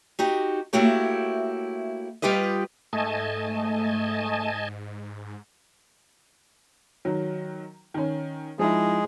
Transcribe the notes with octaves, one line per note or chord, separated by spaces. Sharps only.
D#4 F#4 G4
A3 A#3 E4 F#4 G4 C#5
G3 F4 G4 B4 D#5
G#2 A3 D#5 G#5 A5
D#3 F#3
D#3 C#4
F3 G#3 D#4 E4 G#4